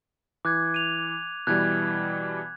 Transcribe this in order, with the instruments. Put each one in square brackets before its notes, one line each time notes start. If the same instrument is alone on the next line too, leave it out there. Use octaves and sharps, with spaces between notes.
[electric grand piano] E3 [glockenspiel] D6 F#6 G#6
[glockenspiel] D#7 F7
[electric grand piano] B2 E3 G3 [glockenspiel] F#6 G#6